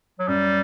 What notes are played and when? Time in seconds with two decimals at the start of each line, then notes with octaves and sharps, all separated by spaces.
0.19 F#3
0.28 F#2 G3